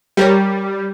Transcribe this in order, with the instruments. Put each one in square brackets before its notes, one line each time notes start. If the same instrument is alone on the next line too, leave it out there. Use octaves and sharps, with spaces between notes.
[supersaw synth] G3 [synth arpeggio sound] G4 A#4 C#5